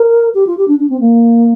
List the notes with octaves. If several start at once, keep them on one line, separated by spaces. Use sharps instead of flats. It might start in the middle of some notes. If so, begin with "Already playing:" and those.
Already playing: A#4
G4
F4
G4
D4
D4
C4
A#3